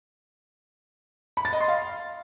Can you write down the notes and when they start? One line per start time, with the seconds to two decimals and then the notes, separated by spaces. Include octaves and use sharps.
1.37 B5
1.45 A6
1.53 D#5
1.61 C6
1.68 F5